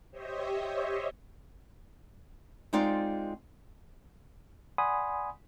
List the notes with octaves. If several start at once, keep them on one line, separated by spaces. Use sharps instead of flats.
G4 C5 C#5 D#5 E5
G#3 C4 D#4 F4 D5
D5 F#5 G#5 B5 C6 D#6